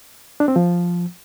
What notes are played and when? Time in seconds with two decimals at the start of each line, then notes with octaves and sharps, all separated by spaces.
0.40 D4
0.48 C4
0.56 F3